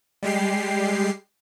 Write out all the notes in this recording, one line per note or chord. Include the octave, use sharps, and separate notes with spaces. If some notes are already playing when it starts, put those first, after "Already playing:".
G3 G#3 G4 C7